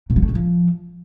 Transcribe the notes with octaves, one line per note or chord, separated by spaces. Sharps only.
A#2
F#3
A3
A2
F3